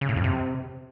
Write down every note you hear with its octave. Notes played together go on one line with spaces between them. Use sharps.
C#3
A2
F2
C3